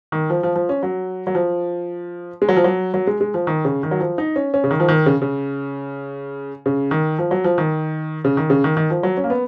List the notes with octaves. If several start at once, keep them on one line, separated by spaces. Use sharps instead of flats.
D#3
F3
F3
F3
C#4
F#3
F#3
F3
G#3
F#3
F3
F#3
F#3
G#3
G#3
F3
D#3
C#3
D#3
F#3
F3
D#4
C#4
C#4
C#3
D#3
F3
D#3
C#3
C#3
C#3
D#3
F3
F#3
F3
D#3
C#3
D#3
C#3
D#3
D#3
F3
F#3
C#4
A#3
B3